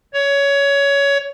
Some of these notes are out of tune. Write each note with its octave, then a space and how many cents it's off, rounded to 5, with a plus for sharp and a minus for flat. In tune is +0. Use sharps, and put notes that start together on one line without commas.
C#5 +20